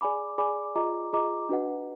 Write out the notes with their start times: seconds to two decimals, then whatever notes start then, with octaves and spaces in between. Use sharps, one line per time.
0.01 G#4 D5 G#5 B5 D6
0.38 G#4 D5 G#5 B5 D6
0.75 F4 G#4 D#5 A#5 D6
1.13 F4 G#4 D#5 A#5 D6
1.49 D4 F#4 B4 D#5 F#5